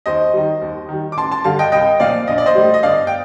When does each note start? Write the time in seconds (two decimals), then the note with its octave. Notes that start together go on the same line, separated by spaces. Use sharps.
0.06 D#2 C5 D#5
0.33 D#3 G3
0.62 D#2
0.89 D#3 G3
1.12 D6
1.17 A1 A5 C6
1.32 A5 C6
1.44 G2 D3 G3 F5 A5
1.59 D#5 G5
1.72 C2 D#5 G5
2.00 A#2 F3 D5 F5
2.27 A#1 D#5
2.38 D5
2.46 C5 D#5
2.55 A2 G3
2.74 D#5
2.83 G1 D5 F5
3.07 G5